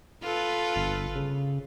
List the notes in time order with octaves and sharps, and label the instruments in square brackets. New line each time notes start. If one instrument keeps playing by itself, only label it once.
[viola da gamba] F4 A4 B4
[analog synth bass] G1
C#3